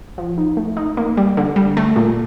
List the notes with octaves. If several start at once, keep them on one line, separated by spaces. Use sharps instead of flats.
F3
D#4
A3
D#4
A#3
G3
D3
G3
A3
A#2